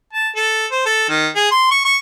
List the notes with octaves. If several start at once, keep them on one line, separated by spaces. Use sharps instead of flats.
A5
A4
C5
A4
D#3
G#4
C6
C#6
C#6